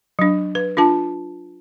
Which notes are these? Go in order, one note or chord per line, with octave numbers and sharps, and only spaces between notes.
F#3 D4
B4
D4 F4 A5